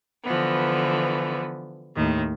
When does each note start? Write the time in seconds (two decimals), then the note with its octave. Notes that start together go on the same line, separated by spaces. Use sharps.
0.24 D3 E3 F3 B3
1.95 D#2 A2 D#3